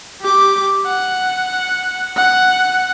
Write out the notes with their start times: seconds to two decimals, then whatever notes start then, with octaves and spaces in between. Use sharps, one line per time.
0.22 G4 D6
0.86 F#5
2.16 F#5